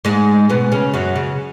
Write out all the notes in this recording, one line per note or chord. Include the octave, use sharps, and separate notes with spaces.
G#2 G#3
B2 B3
C#3 C#4
F#2 F#3
C#3